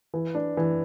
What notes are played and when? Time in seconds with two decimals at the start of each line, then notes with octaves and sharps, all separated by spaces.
0.14 E3
0.35 D4
0.57 E3